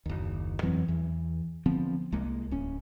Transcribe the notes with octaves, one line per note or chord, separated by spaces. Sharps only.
F#1 D#2
F2 E3 F#3 C4
E2 E3
D3 F3 B3 C4
C2 G#3 A#3
D1 C#4